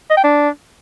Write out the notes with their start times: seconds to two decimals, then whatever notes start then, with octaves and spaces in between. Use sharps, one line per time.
0.10 D#5
0.17 G5
0.23 D4